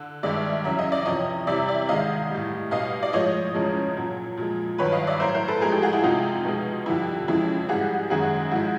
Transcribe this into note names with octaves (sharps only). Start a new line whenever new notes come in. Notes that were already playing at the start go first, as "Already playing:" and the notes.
Already playing: D3
G2 D#3 G#3 D5 E5
E2 C#3 F#3 E5
D#5
D5
E2 C3 F3 C#5 D#5
E2 C3 E3 G3 D5 E5
D5 E5
G#2 D#3 G#3 D#5 F5
A2 E3 G3
B2 G3 D#5 F5
D5
A2 F3 G#3 C#5 D#5
E2 C#3 F3 G#3
A#2 F#3
A#2 F3 G#3
G2 D#3 F#3 B4 C#5
D#5 F5
D5 E5
A2 F#3 A#4 C5
A#4 C5
A4 B4
A2 F3 G#3 G#4 A#4
G4 A4
F#4 G#4
E4 F#4
F2 C3 F3 G#3 D#4 F4
B2 G#3
F2 D3 G3 E4
F2 C#3 E3 G#3 E4
G#2 E3 G3 F#4 G#4
F#2 D#3 G#3 F#4 G#4
G#2 F3 G#3 E4 F#4